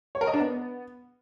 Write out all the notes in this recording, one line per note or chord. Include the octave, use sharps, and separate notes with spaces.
C#5
A#4
D#5
D4
B3